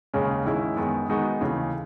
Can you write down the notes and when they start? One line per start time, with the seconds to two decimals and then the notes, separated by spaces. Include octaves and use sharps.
0.14 D#2 C#3 G#3 C#4
0.45 G#2 D#3 G#3 C#4 E4
0.76 F#2 D#3 G#3 B3
1.09 D#3 G#3 B3 D#4 F#4
1.41 D#2 C#3 E3 A3